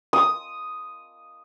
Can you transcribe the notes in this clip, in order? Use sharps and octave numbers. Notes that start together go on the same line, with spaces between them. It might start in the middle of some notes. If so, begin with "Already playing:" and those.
D#6